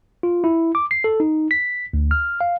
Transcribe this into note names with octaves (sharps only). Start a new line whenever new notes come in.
F4
E4
D6
C7
A4
D#4
B6
D2
F6
F5